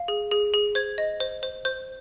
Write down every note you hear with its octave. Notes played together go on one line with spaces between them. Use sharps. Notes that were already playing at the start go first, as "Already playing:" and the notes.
Already playing: F5
G#4
G#4
G#4
C5 G#6
D#5
C5
C5
C5 G6